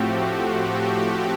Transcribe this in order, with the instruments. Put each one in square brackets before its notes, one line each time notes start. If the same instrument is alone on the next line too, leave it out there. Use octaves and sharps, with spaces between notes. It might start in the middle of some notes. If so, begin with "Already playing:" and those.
Already playing: [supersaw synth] A2 F3 A3 C4 F#4 G4
F#4
G4